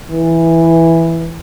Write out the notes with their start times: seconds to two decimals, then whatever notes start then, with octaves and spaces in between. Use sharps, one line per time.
0.10 E3